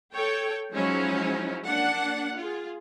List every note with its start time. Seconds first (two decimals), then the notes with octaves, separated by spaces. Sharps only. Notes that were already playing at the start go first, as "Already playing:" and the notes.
0.12 A4 C#5 G5
0.73 F3 F#3 G#3 C#4 D#4 E4
1.65 A#3 D4 F#5
2.37 F4 G#4